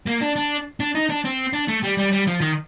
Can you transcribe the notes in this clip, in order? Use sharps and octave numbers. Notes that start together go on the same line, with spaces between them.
A#3
D4
D4
D4
D#4
D4
C4
D4
A3
G3
G3
G3
F3
D#3